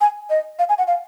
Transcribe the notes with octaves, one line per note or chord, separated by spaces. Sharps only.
G#5
D#5
F5
G#5
F#5
F5